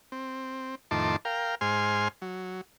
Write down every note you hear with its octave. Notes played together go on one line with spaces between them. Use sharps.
C4
F2 A2 D#3 A5 C6 D6
A#4 F5 G5
G#2 C5 G#5 C6 F6
F#3